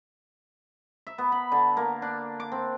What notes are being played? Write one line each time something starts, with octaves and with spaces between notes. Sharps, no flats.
E5
B3
B5
D3
A#3
D4
D6
C4